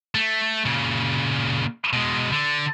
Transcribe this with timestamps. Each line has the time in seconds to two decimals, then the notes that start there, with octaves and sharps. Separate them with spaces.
0.15 A3
0.65 A#2 C#3
1.93 B2 G#3
2.32 D3